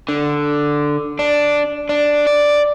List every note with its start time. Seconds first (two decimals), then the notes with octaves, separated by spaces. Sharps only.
0.09 D3
1.19 D4
1.89 D4
2.27 D5